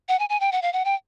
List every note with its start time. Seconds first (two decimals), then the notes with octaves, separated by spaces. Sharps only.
0.08 F#5
0.19 G#5
0.29 G#5
0.40 G5
0.52 F#5
0.62 F5
0.73 F#5
0.85 G5